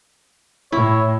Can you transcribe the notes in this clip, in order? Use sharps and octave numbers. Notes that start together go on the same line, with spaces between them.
A2 E4 C#5